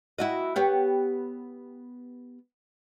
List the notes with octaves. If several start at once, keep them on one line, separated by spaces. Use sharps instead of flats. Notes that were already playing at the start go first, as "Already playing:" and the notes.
E4 F#4 D#5
B3 G4 C#5